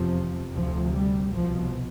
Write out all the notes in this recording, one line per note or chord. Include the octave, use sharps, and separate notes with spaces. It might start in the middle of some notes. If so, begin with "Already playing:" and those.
Already playing: F1 E2 C3 F3
D2 C3 F3
G3
C2 B2 F3